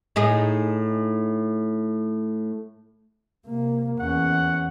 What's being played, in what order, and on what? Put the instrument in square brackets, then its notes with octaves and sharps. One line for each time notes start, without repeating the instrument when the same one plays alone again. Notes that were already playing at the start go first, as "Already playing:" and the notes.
[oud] A2 D#4 G#4
[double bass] C3 A#3
[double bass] E2 C#4 [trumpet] F#5